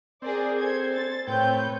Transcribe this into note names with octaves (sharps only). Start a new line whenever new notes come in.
C4 G#4 A#4 D5
A4 C5 G#6
A6
A2 C4 B4 C#5 G5 G6